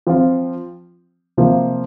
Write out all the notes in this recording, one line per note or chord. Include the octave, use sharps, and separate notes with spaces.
F3 C4 F4
C3 F3 A#3